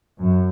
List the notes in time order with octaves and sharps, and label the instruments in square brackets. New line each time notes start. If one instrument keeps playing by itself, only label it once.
[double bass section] F#2